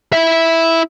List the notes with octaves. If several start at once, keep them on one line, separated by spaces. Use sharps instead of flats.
E4 E5